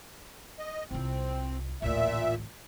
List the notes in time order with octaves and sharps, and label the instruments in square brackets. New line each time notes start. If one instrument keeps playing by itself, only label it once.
[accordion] D#5
[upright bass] C2 F4 [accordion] C4
[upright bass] A1 D2 [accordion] A#2 E5